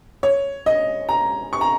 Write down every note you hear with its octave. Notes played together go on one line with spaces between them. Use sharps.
C#5
D#5
A#5
C#6
A#5